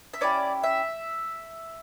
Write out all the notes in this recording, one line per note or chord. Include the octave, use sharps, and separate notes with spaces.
E5
C#4 E4 G4 D5
E5